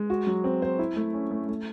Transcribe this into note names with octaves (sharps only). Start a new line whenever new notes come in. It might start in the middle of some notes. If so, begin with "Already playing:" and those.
Already playing: G#3
F#4
F#3
C4
C5
E4
A3
C#4
A3
A3